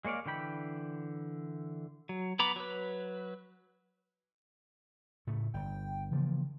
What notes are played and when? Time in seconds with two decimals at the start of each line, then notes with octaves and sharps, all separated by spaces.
0.05 G#3 A#3 C#5 D5 F5
0.26 D3 E3 G5 B5 G6
2.09 F#3
2.39 B3 A#5 B5 D6
2.56 F#3 B4
5.27 A2 C#3 A3
5.54 G1 G5
6.12 C#3 E3 F3 A#3